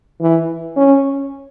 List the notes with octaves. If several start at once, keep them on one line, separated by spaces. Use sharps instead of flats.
E3
C#4